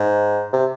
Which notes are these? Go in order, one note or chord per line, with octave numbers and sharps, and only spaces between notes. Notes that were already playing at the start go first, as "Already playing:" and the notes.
Already playing: G#2
C3